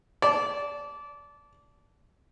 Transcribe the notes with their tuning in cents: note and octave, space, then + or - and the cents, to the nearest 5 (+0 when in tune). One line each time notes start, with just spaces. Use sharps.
D5 -20 A5 -15